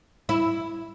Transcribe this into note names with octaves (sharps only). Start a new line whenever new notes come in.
E4